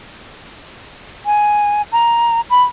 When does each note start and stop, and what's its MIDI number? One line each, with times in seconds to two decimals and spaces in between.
1.26 1.82 80
1.92 2.41 82
2.50 2.62 83